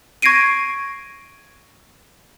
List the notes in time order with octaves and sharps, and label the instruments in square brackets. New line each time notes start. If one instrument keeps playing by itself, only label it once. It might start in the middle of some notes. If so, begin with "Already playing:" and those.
[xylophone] C#6 G#6 A#6 C7 D7 D#7